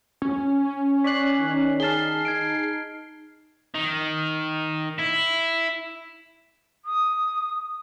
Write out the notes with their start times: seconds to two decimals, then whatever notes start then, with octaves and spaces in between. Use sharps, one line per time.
0.22 C#4
1.04 C#5 D5 F#6 B6 C7
1.40 D#3 D#4
1.80 G#4 A5 F6 C7 G7
2.25 D#4 G#6 D7
3.75 D#3
4.98 E4
6.85 D#6